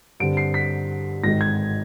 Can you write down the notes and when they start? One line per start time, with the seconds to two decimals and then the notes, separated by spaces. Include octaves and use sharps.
0.20 G2 D3 G3 C4 D7
0.37 C7
0.54 B6
1.23 G#1 G#2 D#3 G#3 A#6
1.41 G#6